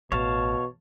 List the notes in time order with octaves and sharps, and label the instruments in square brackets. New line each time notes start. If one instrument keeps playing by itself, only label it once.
[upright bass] A1 [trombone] B2 [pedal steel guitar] C#5 F5 A5